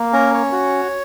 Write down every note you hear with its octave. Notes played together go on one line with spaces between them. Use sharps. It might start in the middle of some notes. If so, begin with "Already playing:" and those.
Already playing: A#3
C#4 A#4
C#5
F#4